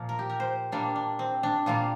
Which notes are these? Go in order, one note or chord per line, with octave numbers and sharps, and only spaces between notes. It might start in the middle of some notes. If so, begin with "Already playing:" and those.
Already playing: A#2 F3 A#3 F4
A#4
G4
A#4
C5
A#2 G3 A#3 D4
D4
C4
D4
A#2 G3 A#3 F4